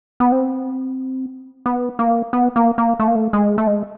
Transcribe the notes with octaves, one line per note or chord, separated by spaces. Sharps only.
B3
C4
B3
A#3
B3
A#3
A#3
A3
A#3
A3
G#3
A3
G#3